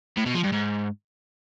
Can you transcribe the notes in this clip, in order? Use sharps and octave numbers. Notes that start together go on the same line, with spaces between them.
A2
B2
F3
G2
G#2